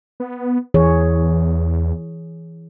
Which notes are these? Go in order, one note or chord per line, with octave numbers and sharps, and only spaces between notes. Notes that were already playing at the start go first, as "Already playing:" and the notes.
B3
E2 E3 G#4 C#5